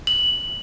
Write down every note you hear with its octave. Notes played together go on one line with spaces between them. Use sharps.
F#7